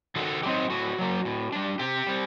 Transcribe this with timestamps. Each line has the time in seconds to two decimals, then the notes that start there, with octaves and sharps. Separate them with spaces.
0.16 D#3 F#4 A4
0.43 F#3 C4 D#4 G4
0.70 A2 F#4
0.98 F#3 A#3
1.25 A2
1.52 G3 D4
1.79 C3 G4
2.06 G3 C4